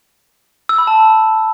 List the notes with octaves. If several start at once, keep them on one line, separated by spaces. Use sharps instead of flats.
E6
B5
A5